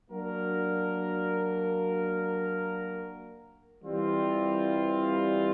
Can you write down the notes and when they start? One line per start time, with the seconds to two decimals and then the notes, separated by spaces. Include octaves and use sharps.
0.11 F#3 A#3 D4 F#4 A#4
3.82 E3 G3 C4 F4